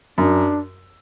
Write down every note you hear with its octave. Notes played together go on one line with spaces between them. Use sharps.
F#2 D4